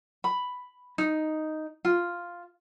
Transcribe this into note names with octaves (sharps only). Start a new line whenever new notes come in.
B5
D#4
F4